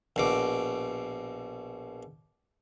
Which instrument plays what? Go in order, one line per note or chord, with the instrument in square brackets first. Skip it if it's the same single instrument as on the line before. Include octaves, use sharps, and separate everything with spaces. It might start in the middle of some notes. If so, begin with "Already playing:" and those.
[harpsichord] A#1 B2 D6